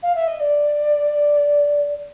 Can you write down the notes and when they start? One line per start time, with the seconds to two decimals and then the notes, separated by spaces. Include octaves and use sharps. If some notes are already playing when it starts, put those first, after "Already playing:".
0.03 F5
0.15 E5
0.27 D#5
0.40 D5